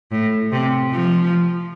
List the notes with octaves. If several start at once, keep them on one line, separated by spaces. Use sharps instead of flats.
A2
C3
F3